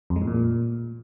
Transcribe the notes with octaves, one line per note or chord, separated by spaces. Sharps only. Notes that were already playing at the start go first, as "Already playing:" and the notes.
F2
G#3
A2
A#2